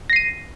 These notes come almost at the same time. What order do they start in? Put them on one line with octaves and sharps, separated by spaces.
A#6 C7 D#7